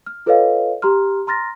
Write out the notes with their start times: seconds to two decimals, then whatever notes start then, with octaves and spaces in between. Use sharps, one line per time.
0.06 F6
0.26 F4 A4 B4 C#5 D#5 F5
0.82 G4 A#5 C6 F6
1.27 A#5 C6 F6 A6 A#6